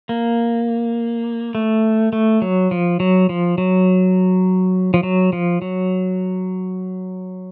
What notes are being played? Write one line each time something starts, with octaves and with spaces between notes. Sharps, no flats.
A#3
A3
A3
F#3
F3
F#3
F3
F#3
F3
F#3
F3
F#3